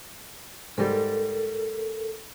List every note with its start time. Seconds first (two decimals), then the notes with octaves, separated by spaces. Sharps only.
0.78 G#2 G3 A4 A#4